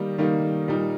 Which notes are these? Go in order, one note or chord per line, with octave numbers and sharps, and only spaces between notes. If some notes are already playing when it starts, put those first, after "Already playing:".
Already playing: D#3 G3 A#3 D#4
D#3 G3 A#3 D#4
A#2 G3 A#3 D#4